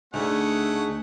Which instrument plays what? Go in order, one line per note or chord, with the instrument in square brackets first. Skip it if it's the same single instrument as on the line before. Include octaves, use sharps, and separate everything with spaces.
[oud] D2 [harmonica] A3 C#4 F#5 [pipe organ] D#4 G#4